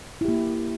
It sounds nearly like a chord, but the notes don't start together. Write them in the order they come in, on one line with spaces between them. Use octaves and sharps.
E4 G4 A#3